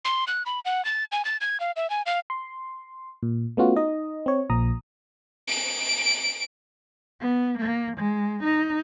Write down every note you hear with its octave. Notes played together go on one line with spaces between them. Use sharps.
C6
F#6
B5
F#5
A6
G#5
A6
G#6
F5
E5
G#5
F5
C6
A#2
A3 B3 C#4 F4 F#4
D#4 D#5
C4 C#5
A#1 A#2 F3 A#5 D#6
D7
B3
A#3
G#3
D#4